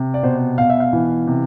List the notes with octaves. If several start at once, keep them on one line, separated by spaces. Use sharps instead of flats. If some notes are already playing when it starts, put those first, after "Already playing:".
Already playing: C3
D5
B2 C5
B2 F5
E5
F5
E3
C3